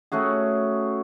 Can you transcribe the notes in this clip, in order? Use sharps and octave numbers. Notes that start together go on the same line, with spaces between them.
A3 C#4 F#4 G#4